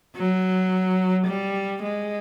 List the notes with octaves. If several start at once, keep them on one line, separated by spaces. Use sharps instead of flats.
F#3
G3
G#3